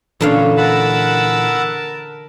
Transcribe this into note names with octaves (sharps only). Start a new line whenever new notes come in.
A#2 D3 E3 C#4 D4 A4 F5
A#4 F#5 A5 B5 E6